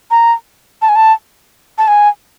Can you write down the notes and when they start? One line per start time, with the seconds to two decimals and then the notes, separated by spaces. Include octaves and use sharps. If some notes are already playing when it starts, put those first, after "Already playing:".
0.11 A#5
0.82 A5
0.89 G#5
0.96 A5
1.78 A5
1.87 G#5